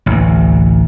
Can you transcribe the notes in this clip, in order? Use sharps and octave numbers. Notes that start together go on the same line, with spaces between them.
A1 D2